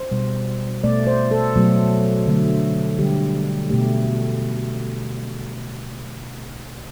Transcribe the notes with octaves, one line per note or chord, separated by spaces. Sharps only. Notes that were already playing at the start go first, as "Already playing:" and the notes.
Already playing: C5
B2 G3
B2 A3 D5
C5
A4
B2 F#3 A3
D3 F#3 A3
D3 G3 G4
B2 A3 G4